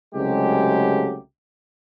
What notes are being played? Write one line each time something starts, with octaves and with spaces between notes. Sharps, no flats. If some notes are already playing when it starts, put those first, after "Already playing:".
C2 C#3 F#3 G#3 A3 G4